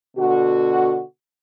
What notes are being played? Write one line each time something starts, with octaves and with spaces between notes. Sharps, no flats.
B2 D3 F#4